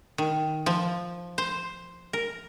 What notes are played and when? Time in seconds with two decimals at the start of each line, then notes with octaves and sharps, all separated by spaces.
0.18 D#3
0.66 F3
1.38 C5
2.13 A#4